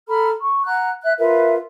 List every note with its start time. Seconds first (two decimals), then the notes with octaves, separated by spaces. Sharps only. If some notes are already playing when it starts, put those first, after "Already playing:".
0.10 A4 A#5 B5 F6
0.41 C#6
0.65 F#5 A#5 F#6
1.03 E5 F#6
1.19 F4 A#4 B4 E5